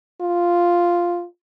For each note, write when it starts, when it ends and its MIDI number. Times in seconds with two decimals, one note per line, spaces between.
0.21 1.25 65